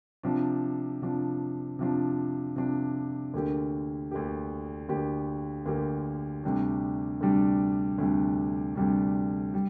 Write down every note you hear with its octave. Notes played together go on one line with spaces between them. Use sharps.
C3 F3 D4
C3 F3 D4
C3 F3 D4
C3 F3 D4
D2 D3 A#3 G4
D2 D3 A#3 G4
D2 D3 A#3 G4
D2 D3 A#3 G4
D2 C3 G3 D4
D2 C3 G3 D4
D2 C3 G3 D4
D2 C3 G3 D4
G3